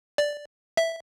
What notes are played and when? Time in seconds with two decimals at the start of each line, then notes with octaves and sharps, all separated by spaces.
0.18 D5
0.77 E5